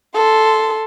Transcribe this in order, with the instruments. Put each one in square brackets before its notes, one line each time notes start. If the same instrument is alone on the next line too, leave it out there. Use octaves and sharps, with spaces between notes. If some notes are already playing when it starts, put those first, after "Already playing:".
[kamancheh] A4 C6